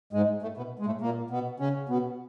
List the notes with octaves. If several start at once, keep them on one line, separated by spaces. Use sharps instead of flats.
G#2 G#3
A2 A3
B2 B3
G#3
A2 A3
A#2 A#3
B2 B3
C#3 C#4
B2 B3